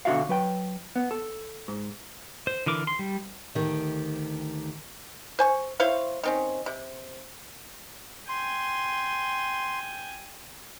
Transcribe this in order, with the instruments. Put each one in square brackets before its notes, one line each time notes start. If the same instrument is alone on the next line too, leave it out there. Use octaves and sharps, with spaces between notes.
[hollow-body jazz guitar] B2 D3 D#3 F#4 E5 F5
F#3 B4 G5
B3
A4
G#2
[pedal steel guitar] C5
D3 E3 A#4 D6
C6
G3
[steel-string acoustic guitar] D2 D#3 G4
[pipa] C5 G#5 C#6
E4 C5 C#5 F5
D#3 C4 C#4
C3
[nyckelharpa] G5 G#5 [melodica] C6